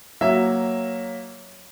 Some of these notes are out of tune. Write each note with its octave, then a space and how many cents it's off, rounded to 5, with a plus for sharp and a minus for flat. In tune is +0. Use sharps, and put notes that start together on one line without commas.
F#3 +0 A#3 +0 E5 +0